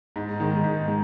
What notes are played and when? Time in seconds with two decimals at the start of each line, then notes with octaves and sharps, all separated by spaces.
0.16 G#2
0.40 D#3 G#3
0.64 G#2
0.88 G#3